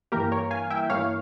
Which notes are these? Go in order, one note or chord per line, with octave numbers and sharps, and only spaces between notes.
G2 E3 A#3 G4 A#4
A#4 C#5
F5 G#5
E5 G5
G2 E3 A#3 C#5 F5